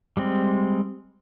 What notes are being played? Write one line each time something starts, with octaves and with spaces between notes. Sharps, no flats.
G3 G#3 C4